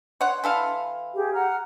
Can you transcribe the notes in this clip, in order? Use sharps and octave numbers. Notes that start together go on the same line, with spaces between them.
C#5 F#5 C6
E3 A4 F5
G4 G#4
F#5 A#5 F6